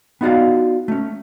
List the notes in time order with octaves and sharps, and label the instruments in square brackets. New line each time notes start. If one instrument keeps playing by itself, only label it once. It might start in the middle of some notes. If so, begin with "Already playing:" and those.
[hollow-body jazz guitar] B3 D#4 F4 F#4 D5 F5
A3 C#4